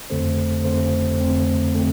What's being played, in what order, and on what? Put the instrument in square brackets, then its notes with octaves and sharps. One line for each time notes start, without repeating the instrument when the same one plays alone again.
[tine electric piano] F2 D3 A3 C4 A4 C5
F2 D3 A3 C4 A4 C5
F2 D3 A3 C4
D3 A3 C4 A4